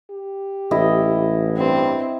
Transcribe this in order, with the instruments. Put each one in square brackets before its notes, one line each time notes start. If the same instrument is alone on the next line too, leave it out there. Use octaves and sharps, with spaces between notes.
[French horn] G4
[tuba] A1 [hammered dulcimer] E4 D#5
[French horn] G2 [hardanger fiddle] C4